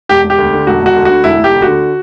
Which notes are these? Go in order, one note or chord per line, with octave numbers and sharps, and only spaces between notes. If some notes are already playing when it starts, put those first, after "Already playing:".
E1 G4
E1
G4
D2
D3
E1 F#4
E1 F#4
D2
D3 F#4
E1 E4
E1 G4
D2
F#4
D3